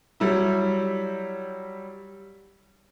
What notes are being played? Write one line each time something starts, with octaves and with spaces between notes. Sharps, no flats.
F#3 G3 E4